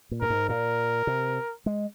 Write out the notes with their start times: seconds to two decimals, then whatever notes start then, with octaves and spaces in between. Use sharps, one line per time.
0.11 A#2
0.21 G2 A#4
0.30 G#2
0.49 A#2 A#4
1.07 C3
1.66 G#3